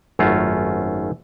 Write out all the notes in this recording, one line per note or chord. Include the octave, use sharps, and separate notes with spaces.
G#1 F#2 A3 C#4 F4 A5